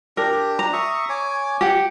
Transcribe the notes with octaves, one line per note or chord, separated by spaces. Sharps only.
D4 G4 A#4
A#5
E5 C#6 D#6
C#5 G#5 D6
G4 F#5